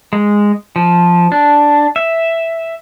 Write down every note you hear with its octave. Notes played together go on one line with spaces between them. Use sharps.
G#3
F3
D4
E5